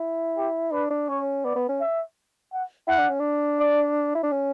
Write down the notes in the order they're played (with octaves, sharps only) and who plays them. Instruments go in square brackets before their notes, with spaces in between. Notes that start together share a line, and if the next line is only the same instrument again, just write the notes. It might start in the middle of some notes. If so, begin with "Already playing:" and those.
Already playing: [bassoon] E4
[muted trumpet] G4
[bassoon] D4 [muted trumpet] B4
[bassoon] D4
[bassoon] C#4 [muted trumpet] C#5
[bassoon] B3 [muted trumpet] D5
[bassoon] B3
C#4
[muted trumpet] E5
F#5
[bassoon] E4 [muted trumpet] F#5
[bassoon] D4
C#4
D4
[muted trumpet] D5
[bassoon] E4
D4
C#4